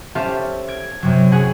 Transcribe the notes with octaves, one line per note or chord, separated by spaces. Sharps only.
C#4 G4 A4 C5 E5 F5
G#6 D7
F#2 C3 F#3
C#4 G#4 F#5 G#5